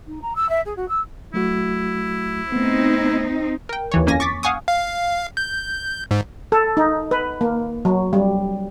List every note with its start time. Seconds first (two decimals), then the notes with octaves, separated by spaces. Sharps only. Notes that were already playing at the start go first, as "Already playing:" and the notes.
0.07 D#4
0.22 A#5
0.35 E6
0.49 E5
0.65 G#4
0.76 F#4
0.88 E6
1.34 F#3 A3 E4 F#4
2.52 A3 B3 C4 D#4
3.69 A#4 G5
3.92 D#2 E3 C#5
4.06 F2 A#3 C#4 G#5 A#6
4.20 C#6 D6 A6 B6
4.43 F5 F#5 G#5 C#6 D#6
4.68 F5
5.37 G6
6.11 G#2
6.52 A4
6.77 D#4
7.11 B4
7.41 A#3
7.85 F#3
8.13 G3